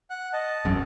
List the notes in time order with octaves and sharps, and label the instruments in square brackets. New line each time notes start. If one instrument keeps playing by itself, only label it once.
[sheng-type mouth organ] F#5 F#6
D#5 A5
[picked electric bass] E1 B1 F#2